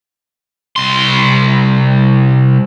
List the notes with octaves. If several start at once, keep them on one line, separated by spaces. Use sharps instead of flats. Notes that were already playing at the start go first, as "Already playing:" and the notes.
C2 C6